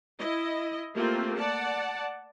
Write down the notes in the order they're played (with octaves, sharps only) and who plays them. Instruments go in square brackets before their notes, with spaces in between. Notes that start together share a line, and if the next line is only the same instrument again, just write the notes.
[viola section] E4 D#5
A3 A#3 C4 F4 G4
D5 F#5 A5